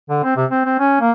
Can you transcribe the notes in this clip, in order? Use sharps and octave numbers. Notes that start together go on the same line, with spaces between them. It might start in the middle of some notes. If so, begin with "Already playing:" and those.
D3
C4
C3
C4
C4
C#4
A#3